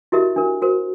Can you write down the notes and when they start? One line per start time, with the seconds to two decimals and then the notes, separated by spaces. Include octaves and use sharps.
0.12 E4 F#4 G4 A#4 D#5 E5
0.36 D4 A#4
0.62 F#4 A#4 C5